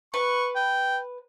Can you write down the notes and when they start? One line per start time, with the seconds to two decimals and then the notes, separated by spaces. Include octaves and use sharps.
0.14 B4 C#6
0.55 G5